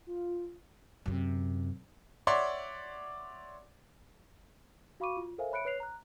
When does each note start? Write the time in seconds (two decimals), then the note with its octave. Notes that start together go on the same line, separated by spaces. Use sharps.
0.07 F4
1.06 F#2 C3
2.27 C#5 D5 E5 F#5 C6
5.00 F#4 F5 B5 C#6 D6 D#7
5.17 F4
5.38 A4 A#4 C5 E5 F5 G#5
5.51 C#5 E5 B5 F#6 C#7 D7
5.65 B4 C#5 F#6 C7 F7
5.80 A#5 F#6